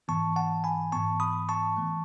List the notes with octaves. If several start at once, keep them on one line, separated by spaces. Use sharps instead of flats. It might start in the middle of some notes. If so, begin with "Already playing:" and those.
G#2 E3 B3 A5 C#6
F#5 A5
G#5 B5
G#2 E3 B3 A5 C#6
B5 D#6
A5 C#6
E3 A3